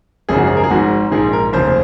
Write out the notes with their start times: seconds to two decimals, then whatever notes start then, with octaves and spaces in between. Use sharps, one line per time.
0.29 G#1 F#2 C#3 F3 G#4
0.39 F#4
0.47 G#4
0.57 A#4
0.64 G#4
0.70 G#1 G#2 F3 F#4
1.11 A#1 G#2 D#3 G#4
1.33 A#4
1.53 F1 D#2 C#3 F3 C5